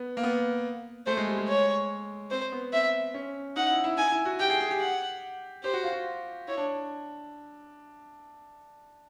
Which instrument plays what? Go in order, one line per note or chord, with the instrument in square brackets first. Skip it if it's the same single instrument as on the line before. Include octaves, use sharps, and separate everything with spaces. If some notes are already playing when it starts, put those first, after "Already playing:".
Already playing: [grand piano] B3
A#3
B3
[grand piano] A3 [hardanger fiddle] C5
[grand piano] G#3
G3
G#3
[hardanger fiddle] C#5
[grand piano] C4 [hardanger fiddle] C5
[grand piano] B3
[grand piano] C4 [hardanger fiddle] E5
[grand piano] C#4
[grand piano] D#4 [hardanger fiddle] F#5
[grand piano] E4
E4
[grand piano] D#4 [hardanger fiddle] G#5
[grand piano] E4
F#4
[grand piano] G4 [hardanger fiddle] G5
[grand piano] G#4
G#4
G4
[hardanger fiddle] F#5
[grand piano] G4 [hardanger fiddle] C5
[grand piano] F#4
F4
F#4
[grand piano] E4 [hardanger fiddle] C#5
[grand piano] D4